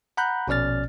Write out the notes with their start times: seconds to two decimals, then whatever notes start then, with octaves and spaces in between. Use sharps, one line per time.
0.17 F#5 A#5 B5 F#6 G6
0.48 A#1 B2 C#4 D5 F6 A6